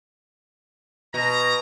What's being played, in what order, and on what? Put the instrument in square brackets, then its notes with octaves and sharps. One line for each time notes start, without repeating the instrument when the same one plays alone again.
[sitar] B2 [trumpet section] A#5